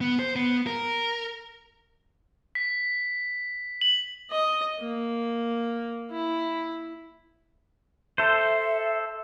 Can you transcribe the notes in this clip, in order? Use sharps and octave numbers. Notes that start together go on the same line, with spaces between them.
B3
C5
B3
A#4
B6
F#7
D#5
A#3
E4
A4 C5 E5